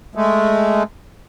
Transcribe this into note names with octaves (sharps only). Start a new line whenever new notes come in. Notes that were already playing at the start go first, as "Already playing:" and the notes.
G#3 A3